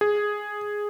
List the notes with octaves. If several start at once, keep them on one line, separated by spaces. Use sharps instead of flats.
G#4